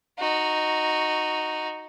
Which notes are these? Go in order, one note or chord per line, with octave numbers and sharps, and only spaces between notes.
D#4 F#4